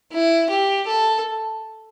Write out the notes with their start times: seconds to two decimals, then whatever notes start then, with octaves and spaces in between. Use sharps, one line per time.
0.13 E4
0.50 G4
0.87 A4